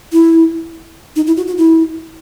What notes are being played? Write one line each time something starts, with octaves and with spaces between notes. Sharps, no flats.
E4
D#4
E4
F#4
F#4
E4